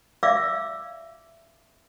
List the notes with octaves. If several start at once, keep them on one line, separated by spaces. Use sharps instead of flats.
D5 E5 F5 D6 E6